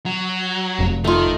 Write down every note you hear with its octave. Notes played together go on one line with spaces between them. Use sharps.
F#3
F1
D#3 A3 D#4 F4